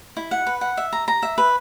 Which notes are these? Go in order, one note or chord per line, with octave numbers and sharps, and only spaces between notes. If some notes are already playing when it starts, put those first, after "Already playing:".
E4
F#5
B4
F#5
E5
A#5
A#5
E5
B4